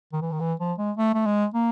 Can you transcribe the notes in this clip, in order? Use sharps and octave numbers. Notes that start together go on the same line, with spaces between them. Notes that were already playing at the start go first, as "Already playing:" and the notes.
D#3
E3
D#3
E3
F3
G#3
A3
A3
G#3
A#3